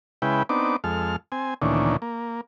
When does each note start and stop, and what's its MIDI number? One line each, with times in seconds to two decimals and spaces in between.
0.22 0.43 49
0.22 0.43 56
0.22 0.43 64
0.22 0.43 71
0.22 0.43 79
0.49 0.76 59
0.49 0.76 60
0.49 0.76 62
0.49 0.76 63
0.49 0.76 86
0.84 1.16 41
0.84 1.16 56
0.84 1.16 69
0.84 1.16 89
1.32 1.54 60
1.32 1.54 80
1.62 1.97 38
1.62 1.97 46
1.62 1.97 51
1.62 1.97 52
1.62 1.97 61
1.62 1.97 62
2.02 2.41 58